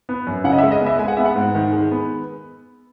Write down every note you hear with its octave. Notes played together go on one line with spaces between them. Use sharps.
B3
F#2
C#3 F#5
D#5
E5
G#3
D#5
B3
E5
G#3 G#5
F#5
B3 E5
F#5
G#2
D#3
G#3
B3